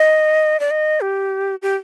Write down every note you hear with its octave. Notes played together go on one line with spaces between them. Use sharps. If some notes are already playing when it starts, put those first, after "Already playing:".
Already playing: D#5
D5
D#5
G4
G4